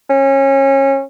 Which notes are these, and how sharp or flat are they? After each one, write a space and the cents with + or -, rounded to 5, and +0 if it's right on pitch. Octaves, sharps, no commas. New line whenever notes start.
C#4 -25